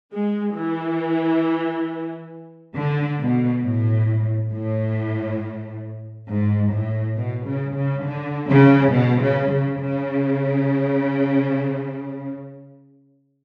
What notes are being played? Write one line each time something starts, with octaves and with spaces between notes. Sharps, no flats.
G#3
E3
D3
B2
A2
A2
G#2
A2
B2
C#3
C#3
D3
C#3
B2
C#3
C#3
C#3